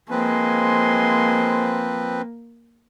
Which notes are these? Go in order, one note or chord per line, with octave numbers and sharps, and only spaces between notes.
F3 G#3 A#3 C4 B4 G#5 C6